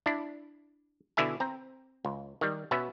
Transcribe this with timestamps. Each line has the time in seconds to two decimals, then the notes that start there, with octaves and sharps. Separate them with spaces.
0.06 D4 E4
1.17 B2 D3 E4 E5 G#5
1.40 C4 A#5
2.05 C#2
2.41 D#3 G3
2.71 B2 B3 C#4 B4 E5